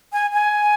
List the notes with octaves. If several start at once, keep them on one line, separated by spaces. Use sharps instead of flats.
G#5
G#5